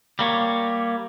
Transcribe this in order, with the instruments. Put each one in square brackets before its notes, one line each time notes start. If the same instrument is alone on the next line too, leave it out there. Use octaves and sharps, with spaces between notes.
[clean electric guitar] G3 A#3 C#5